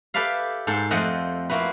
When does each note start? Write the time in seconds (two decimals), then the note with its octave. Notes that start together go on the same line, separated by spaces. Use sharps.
0.14 G4 A4 B4 D5 E5 F5
0.67 G#2 A4 C5
0.91 F2 A3 C4 A4 D#5 F#5
1.49 A#3 C4 E4 F#4 B4